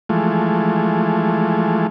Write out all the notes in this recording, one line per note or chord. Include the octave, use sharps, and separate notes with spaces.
E3 F3 G#3 A3